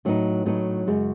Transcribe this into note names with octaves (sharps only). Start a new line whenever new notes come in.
A2 F#3 B3 D#4
A2 F#3 B3 D#4
F#2 C#3 G#3